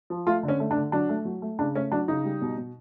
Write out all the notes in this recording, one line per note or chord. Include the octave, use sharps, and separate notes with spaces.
F3
A3 F4
D3
C#4
A3
D4
D3
F#3 D4
A3
F#3
A3
C#3 D4
A3 C#4
F#3 D4
C#3 D#4
G3
B2
B2